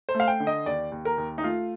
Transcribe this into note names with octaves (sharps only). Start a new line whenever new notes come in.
C5
A3
F5
G5
D3
D#5
D#2 D5
D#2
A#4
D#2
D#4
A3 F4